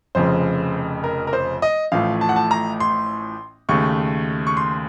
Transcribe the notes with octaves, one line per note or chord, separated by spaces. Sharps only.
F1 F2 C#3 C5
A#4
A#4
C5
D#5
A1 A2 F3 A3 F5
A5
F#5
A5
A#5
C6
D#2 C#3 A3 C#6
C#6
C6